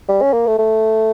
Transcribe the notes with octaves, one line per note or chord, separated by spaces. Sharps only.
G3
C#4
A#3
A3
A3